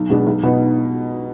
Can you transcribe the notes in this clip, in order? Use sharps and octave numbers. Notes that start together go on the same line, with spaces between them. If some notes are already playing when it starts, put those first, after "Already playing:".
Already playing: B1
B2 G#3 B3 D4
B1
B2 B3 D#4